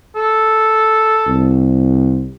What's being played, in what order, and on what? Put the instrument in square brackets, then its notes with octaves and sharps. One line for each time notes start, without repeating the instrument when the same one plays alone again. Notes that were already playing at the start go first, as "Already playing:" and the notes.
[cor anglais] A4
[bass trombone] C2